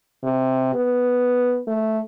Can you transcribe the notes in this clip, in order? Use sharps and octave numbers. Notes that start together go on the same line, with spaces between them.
C3
B3
A3